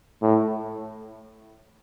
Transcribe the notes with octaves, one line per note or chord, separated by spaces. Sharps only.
A2